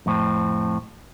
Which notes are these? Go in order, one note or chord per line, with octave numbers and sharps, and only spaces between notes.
F2 A2 C4